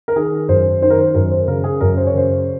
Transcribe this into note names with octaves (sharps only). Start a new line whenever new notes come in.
A#4
D#3 G#4
F#2 C5
D#3 C5
A#4
C5
F#2 A#4
C5
C#3 A#4
G#4
F#2 A#4
C5
C#5
C#3 C5